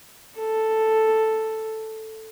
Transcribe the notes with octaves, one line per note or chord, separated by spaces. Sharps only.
A4